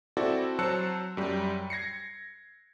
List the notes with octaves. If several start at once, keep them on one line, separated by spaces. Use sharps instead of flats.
C4 E4 F#4 A4 D5
F#3 C5 A5 E6 F#6 C#7
F#2 G3
G#6 A#6 C7 C#7